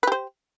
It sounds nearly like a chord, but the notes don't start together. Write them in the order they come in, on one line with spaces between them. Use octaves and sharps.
B4 G4 C5